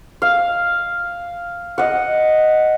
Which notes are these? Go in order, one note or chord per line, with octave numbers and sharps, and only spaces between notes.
F5
D#5 F#5